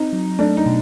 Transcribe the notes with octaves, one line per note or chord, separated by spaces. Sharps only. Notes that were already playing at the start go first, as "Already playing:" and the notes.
Already playing: C4 D#4
F#3
A3 D4
D#4
B2